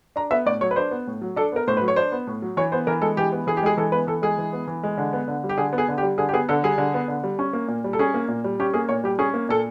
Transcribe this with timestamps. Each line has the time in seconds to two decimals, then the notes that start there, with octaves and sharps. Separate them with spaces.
0.16 D4 A#5
0.31 B3 E5
0.46 A2 D5
0.61 F#3 C#5
0.71 B4
0.76 D4 C5
0.91 B3
1.07 A2
1.22 F#3
1.36 D4 A4
1.52 B3 A#4
1.67 A2 C5
1.77 B4
1.81 F#3
1.88 C#5
1.96 D4 C5
2.12 B3
2.27 A2
2.42 F#3
2.57 E3 C#5
2.72 B3 C5
2.87 E3 A#4
3.02 G#3 A4
3.17 E3 G4
3.32 B3
3.47 E3 G#4
3.57 G4
3.63 G#3 G#4
3.77 E3 A4
3.92 B3 B4
4.07 E3 A4
4.22 G#3 G#4
4.38 E3
4.53 B3
4.68 E3
4.83 G#3
4.98 D3
5.13 B3
5.28 D3
5.44 G3
5.49 G4
5.57 D3 G#4
5.73 B3
5.78 G#4
5.88 D3
5.98 G4
6.03 G3
6.18 D3 G#4
6.29 G4
6.33 B3 G#4
6.49 D3 A4
6.63 G3 G#4
6.78 D3
6.94 B3
7.08 D3
7.24 G3
7.39 C#4
7.53 A#3
7.68 A#2
7.84 G3
7.93 A4
7.99 C#4 G#4
8.14 A#3
8.28 A#2
8.44 G3
8.60 C#4 G4
8.74 A#3 G#4
8.89 A#2 C#5
9.04 G3 G4
9.19 C#4 G#4
9.34 A#3
9.49 A#2 A4